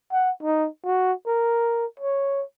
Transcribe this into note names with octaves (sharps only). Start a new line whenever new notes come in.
F#5
D#4
F#4
A#4
C#5